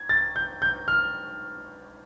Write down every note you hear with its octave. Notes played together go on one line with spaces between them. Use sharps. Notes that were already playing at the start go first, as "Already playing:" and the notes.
Already playing: G#6
A6
G6
G6
F6